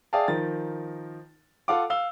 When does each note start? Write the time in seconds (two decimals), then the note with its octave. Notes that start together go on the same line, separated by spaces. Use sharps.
0.13 G#4 D5 E5 F5 G5 A5
0.28 D#3 F3 A#4 A6
1.68 F4 A4 F5 F#5 D6
1.90 F5 E6 G7